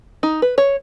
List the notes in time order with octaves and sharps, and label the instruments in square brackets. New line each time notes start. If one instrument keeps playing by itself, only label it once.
[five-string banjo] D#4
B4
C#5